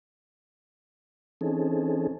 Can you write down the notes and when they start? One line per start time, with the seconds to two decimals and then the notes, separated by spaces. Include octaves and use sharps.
1.41 E3 C4 C#4 D#4 G#4 A4